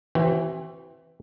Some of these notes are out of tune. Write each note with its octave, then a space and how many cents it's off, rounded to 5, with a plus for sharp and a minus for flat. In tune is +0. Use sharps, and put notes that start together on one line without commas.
E3 +0 C4 +25 F#4 +45